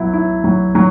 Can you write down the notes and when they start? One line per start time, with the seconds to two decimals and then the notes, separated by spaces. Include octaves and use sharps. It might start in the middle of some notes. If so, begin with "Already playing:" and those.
Already playing: B2 F#3 E4
0.13 E4
0.44 F#3
0.75 F#3